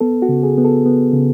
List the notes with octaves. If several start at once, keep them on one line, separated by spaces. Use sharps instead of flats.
B3 A4
F#4
C#3
G#4
B3
A4
B3
C#3